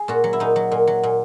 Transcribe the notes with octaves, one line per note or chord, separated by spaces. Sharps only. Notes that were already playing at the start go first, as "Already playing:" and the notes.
Already playing: G#4
A#2 F#4
F#3
E4
A#2 D#4
F#3
A#2
F#3
A#2